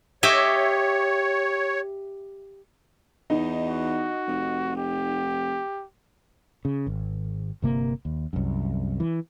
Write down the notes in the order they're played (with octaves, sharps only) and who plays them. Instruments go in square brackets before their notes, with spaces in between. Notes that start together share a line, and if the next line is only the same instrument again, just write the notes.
[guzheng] G4 D#5 E5 [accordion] C#5
[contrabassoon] E2 [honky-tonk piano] D#4
[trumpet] F#4
[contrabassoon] F1
[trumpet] G4
[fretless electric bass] C#3
G#1
G1 C3 A#3
D#2
C2 F#2
E3